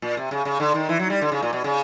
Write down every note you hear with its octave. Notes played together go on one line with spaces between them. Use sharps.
A#2
C3
C#3
C#3
D3
D#3
E3
F#3
G3
D3
C#3
A#2
B2
C#3